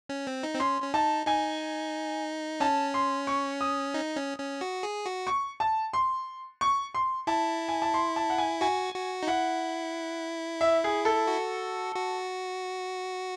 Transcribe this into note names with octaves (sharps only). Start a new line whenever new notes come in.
C#4
C4
D#4
C4
C#4 C6
C#4
D#4 A5
D#4 G#5
C#4 A5
C6
C#6
D#6
D#4
C#4
C#4
F#4
G#4
F#4
C#6
A5
C6
C#6
C6
E4 A5
G#5
A5
C6
A5
F#5
G#5
F#4 G#5
F#4
D#4
E4 F#5
E5
G#4
A4
F#4
F#4